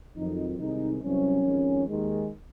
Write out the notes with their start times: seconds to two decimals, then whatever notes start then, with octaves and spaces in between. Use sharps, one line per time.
0.16 F2 D#3 F#3 D#4
0.59 C2 C3 D#3 G#3 D#4
1.02 C2 C3 F#3 C#4
1.44 F2 D#3 G#3
1.86 D#2 D#3 G#3